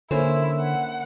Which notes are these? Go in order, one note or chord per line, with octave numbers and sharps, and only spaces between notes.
D3 A#3 C#4 E4 C5
F#5